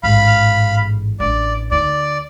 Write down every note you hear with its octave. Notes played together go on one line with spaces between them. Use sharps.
A1 G#2 F5 B5
A1 D4 D5
D2 D#4 D5